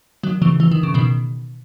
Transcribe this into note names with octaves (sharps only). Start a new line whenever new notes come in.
D#3 F#3
C#3 E3
E3
D#3
C#3
B2 D#3